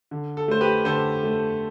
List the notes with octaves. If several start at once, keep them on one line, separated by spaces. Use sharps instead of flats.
D3
A4
A3 C5
G4 B4
D3 A4 C5
A3